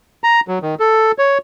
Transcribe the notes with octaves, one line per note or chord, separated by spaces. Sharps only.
A#5
F#3
D#3
A4
C#5